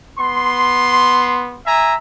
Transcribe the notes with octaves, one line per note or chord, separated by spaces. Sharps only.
B3 C6
E5 G#5 A#5